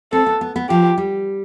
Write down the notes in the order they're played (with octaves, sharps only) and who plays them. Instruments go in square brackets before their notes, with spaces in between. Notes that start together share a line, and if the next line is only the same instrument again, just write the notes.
[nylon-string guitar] C4 [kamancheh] A4
[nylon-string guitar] B3
B3
B3
[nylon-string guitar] F3 [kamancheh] G4
[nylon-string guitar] G3